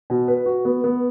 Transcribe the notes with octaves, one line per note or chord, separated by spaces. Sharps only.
B2
B4
F#4
B3
B3